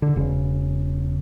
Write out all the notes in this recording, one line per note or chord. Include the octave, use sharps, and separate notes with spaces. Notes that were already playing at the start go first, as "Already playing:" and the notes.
D3
E1 C#3